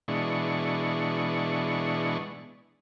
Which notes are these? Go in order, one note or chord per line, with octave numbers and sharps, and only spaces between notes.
B2 E3 G#3 D4 C#6